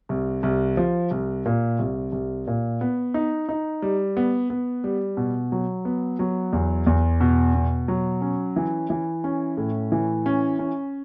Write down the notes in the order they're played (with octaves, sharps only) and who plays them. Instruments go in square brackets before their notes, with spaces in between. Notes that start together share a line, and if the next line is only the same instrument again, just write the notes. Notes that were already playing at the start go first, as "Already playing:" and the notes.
[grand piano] C2
C2
F3
C2
A#2
C2
C2
A#2
B3
D#4
D#4
G3
B3
B3
G3
B2
F#3
B3
F#3
E2
E2
B2
B2
F#3
C#4
E3
E3
C#4
A2
E3
C#4
C#4